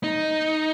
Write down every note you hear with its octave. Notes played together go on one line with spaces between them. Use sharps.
D#4